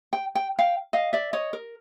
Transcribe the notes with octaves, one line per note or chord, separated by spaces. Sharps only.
G5
G5
F5 G5
D#5 F5
D5 E5
C#5 D#5
A#4